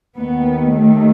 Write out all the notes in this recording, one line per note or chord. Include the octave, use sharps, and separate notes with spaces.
D#2 D#3 B3
A3